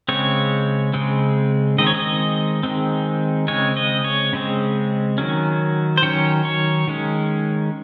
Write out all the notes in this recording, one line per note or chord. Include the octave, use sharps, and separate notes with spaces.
C#3 G#3 C4 C#5
C#3 G#3 C4
D#3 G#3 C4 D#5
C#5
D#5
D#3 G#3 C4
C#3 G#3 C4 C#5
D#5
C#5
C#3 G#3 C4
D#3 F#3 C#4
C5
D#3 F#3 C#4 C#5
C#5
D#3 G#3 C#4